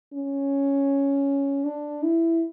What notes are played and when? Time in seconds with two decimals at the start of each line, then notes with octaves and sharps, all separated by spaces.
0.13 C#4
1.65 D4
2.03 E4